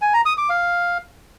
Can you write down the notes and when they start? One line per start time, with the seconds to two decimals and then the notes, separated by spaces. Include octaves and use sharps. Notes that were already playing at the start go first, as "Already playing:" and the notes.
0.02 G#5
0.14 A#5
0.26 D#6
0.38 D6
0.50 F5